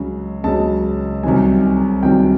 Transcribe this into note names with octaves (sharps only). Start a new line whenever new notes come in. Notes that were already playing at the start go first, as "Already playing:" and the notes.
Already playing: C#2 C#3 F#3
C#2 C#3 F#3 A5
C2 C3 D#3 F#3 G#5
C2 C3 D#3 F#3 G5